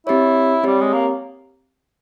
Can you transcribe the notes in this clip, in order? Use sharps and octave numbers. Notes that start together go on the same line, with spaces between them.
C4 E4 G4 C#5
G3 C4 G4 C#5
G#3
A#3